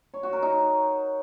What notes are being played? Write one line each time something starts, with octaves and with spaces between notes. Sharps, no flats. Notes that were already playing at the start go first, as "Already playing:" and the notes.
C#5
F#4
A#4
D#4